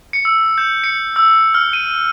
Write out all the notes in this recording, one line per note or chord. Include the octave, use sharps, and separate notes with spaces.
C#7
E6
G6
C#7
E6
F6
D#7